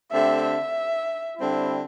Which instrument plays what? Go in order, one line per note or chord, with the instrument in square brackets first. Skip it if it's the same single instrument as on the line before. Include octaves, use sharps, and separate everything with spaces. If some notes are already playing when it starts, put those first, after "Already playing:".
[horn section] D3 A3 C4 G4 [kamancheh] E5
[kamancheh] E5
[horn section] D3 G3 C4 E4